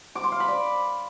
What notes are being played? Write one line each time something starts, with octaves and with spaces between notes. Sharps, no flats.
D6
C6
F5
B5
D5